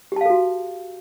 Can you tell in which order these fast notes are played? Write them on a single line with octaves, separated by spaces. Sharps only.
G4 A5 F5 A4 F#4